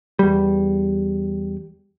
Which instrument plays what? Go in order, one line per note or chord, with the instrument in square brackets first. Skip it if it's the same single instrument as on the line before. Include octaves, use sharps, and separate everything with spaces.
[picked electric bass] E2 G3